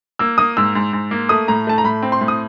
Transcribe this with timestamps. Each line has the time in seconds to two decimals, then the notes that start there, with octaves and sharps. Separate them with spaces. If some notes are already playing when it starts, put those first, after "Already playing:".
0.19 A#3 E6
0.38 A#3 D#6
0.57 G#2 E6
0.75 G#2
0.93 G#2
1.11 A#3
1.29 A3 D#6
1.48 A2 A#5
1.67 A3 A5
1.78 A#5
1.84 A2 B5
2.02 C4
2.12 C6
2.21 A2
2.28 D#6